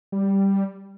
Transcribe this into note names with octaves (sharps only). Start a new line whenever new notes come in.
G3